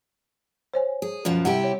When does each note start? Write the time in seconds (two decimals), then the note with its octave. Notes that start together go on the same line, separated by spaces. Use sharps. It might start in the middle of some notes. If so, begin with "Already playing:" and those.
0.74 C5 C#5 G#5
1.02 G#4
1.25 F#2 B2 F3
1.45 C3 G3 E4 G4 F#5
1.64 C#5